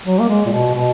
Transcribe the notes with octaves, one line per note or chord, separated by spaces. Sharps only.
F#3
A#3
G#3
A#2
B2
B2